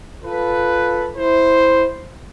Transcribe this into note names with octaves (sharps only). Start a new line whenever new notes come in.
F4 A4 B4
E4 C5